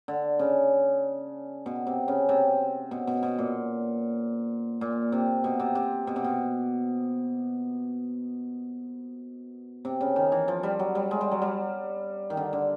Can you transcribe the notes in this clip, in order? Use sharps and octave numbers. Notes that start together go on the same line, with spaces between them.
D3
C#3
B2
C3
C#3
C3
B2
B2
B2
A#2
A#2
C3
B2
C3
C3
B2
C3
B2
C3
C#3
D#3
E3
F3
G3
F#3
G3
G#3
G3
F#3
G3
D#3
D3
D3